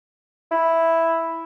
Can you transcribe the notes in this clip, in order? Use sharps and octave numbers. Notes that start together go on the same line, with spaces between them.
E4